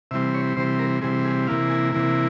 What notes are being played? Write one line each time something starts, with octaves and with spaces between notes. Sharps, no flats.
C3 E3 G3 C4 E5
C#5
C3 E3 G3 C4 C5
A#4
C3 E3 G3 C4 G#4
G#4
C3 E3 A#3 E4 F5
G#5
C3 E3 A#3 E4